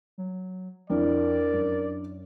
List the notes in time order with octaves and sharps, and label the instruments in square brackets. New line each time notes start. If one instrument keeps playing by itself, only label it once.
[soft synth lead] F#3
[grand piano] F2 [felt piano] D4 E4 [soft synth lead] A#4 [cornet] D5
[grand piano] F#2